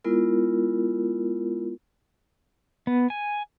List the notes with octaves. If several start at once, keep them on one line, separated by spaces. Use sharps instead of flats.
G#3 B3 E4 F4 A#4
B3
G#5